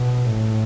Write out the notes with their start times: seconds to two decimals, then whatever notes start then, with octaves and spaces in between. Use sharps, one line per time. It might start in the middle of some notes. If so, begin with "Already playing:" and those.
Already playing: B2
0.26 A2